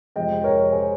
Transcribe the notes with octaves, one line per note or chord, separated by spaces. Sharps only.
F2 C3 F3 G#3 D#5 G5
A#4 C#5
G#4 C5